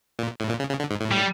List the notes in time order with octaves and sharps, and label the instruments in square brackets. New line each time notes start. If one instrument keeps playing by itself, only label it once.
[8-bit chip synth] A#2
A2
A#2
C#3
C#3
D3
G#2
A2
[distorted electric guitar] G3